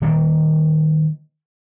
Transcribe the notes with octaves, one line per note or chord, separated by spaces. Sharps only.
D#3 G3 A#3